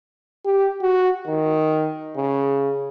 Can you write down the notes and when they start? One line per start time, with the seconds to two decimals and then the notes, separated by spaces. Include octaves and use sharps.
0.45 G4
0.82 F#4
1.27 D#3
2.17 C#3